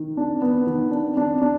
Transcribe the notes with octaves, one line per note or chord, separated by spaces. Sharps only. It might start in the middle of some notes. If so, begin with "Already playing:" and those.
Already playing: D#3
D4
B3
D#3
D4
D4
D4